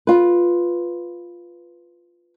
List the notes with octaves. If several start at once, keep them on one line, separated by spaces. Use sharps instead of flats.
F4 B4